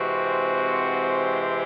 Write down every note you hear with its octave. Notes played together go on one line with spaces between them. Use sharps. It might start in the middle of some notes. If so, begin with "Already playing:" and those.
Already playing: C3 E3 G#3 C4 F#4